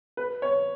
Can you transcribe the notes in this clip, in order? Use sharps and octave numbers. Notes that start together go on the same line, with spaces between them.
B4
C#5